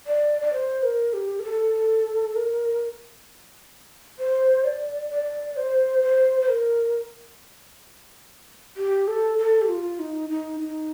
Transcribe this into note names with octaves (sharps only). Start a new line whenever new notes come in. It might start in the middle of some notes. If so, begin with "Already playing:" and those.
D5
D5
C5
A#4
G4
A#4
A4
A#4
C5
D5
D5
C5
C5
C5
A#4
G4
A4
A4
G4
F4
D#4
D#4
D#4